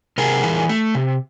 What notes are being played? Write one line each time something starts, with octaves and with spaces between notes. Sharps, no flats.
C3 G#4 A#4
E3
A3
C3